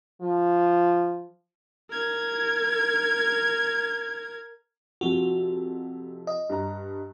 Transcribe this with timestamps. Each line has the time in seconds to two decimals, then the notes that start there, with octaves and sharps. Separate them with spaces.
0.22 F3
1.91 A#4 G#6
5.01 F2 C3 F3 F#4
6.27 D#5
6.49 G2 A#5